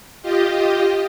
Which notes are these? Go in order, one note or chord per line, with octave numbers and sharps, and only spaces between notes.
F4 G4 D#5